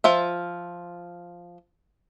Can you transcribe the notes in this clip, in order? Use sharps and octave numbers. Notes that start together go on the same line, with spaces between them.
F3 F4 E5